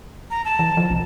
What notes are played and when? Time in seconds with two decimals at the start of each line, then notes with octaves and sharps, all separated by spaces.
0.31 A#5
0.45 A5
0.59 E3
0.77 F3
0.90 B1